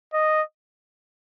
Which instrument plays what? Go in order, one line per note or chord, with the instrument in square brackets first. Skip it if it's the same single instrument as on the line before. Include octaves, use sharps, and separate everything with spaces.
[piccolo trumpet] D#5